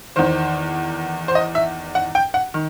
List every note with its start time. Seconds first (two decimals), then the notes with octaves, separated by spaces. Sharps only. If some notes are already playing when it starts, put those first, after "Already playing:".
0.16 E2 D#3 C5
1.28 C5
1.35 D#5
1.55 E5
1.95 F#5
2.15 G5
2.34 F#5
2.54 D#3